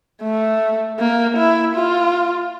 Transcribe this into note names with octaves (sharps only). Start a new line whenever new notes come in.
A3
A#3
E4
F4